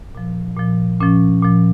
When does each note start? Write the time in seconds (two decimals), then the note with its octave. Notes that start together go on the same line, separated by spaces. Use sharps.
0.15 A#2 F3
0.57 A#2 F3
1.00 A#2 F3 C#4
1.43 A#2 F3